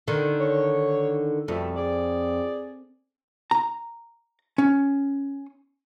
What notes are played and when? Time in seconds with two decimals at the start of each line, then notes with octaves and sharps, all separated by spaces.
0.08 D3 D#3
0.40 C#5
1.48 F2 B2 G3 A3
1.77 G#4 D5
3.51 A#5
4.58 C#4